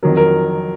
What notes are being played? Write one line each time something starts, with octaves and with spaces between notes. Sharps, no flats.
F2 D#3 F#3 A#4
A#4